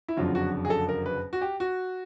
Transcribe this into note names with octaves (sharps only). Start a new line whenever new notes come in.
E4
F#1 F2 D3 F#3 F4
F#4
G#4
A4
A#4
B4
F#4
G4
F#4